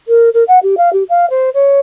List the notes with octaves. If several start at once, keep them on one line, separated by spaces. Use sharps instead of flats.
A#4
A#4
F#5
G4
F5
G4
F5
C5
C#5